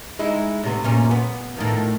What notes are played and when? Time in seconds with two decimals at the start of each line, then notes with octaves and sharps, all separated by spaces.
0.19 G#3 D#4 E4
0.63 A2 C3 B3
0.84 F#2 A#2 C#4
1.11 B3
1.56 A2 D#3 F3